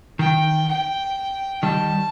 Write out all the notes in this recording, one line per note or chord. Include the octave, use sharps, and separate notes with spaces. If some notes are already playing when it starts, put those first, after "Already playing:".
D#3 G5
G5
D#3 G3 A5